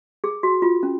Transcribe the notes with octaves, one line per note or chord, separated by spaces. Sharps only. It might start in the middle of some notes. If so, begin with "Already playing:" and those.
G#4
F#4
F4
C#4